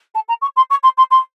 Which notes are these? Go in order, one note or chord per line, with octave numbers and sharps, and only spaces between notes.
A5
A#5
C#6
C6
C#6
C6
C6
C6